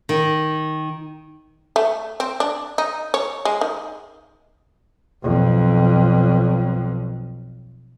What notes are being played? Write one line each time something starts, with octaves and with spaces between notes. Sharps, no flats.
D#3
A3
C4
D4
D#4
C#5
G#3
D#3
B1 F2